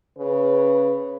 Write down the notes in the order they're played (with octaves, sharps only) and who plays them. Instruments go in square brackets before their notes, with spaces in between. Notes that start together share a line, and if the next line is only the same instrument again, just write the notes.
[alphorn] C#3 [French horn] B4